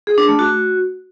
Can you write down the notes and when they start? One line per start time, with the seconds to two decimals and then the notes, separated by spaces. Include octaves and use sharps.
0.07 G#4
0.18 D4
0.28 A3
0.39 F#4